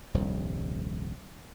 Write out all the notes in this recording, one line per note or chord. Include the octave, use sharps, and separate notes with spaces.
D#1 C2 G2 F3